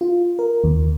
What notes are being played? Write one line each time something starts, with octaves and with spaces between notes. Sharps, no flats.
F4
A#4
D#2